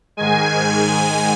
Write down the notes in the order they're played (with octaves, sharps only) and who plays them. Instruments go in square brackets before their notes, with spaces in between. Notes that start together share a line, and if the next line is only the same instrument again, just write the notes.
[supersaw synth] G#2 D#3 G#3 G#5